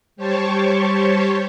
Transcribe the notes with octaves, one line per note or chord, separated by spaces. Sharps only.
G3 G4 C5 C#5 A5 C#6